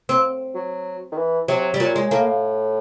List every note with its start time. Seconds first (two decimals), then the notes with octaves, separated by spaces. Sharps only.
0.09 C4
0.55 F#3
1.12 D#3
1.18 E3
1.48 C3 F#3
1.74 G3
1.80 A#2 F#3
1.96 G#3
2.11 A2 A#3